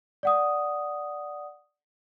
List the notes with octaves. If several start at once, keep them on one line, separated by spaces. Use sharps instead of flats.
D5 F#5 D#6